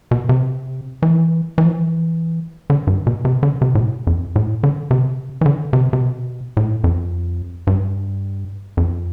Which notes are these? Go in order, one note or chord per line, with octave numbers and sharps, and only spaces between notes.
B2
C3
E3
E3
F3
E3
D3
G2
B2
C3
D3
C3
A2
B2
F2
A2
D3
C3
E3
D3
C3
C3
B2
A2
F2
G2
F2